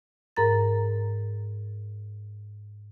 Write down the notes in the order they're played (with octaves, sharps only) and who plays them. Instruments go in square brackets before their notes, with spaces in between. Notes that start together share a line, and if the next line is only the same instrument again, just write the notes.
[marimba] G#2 A#4 A#5 A6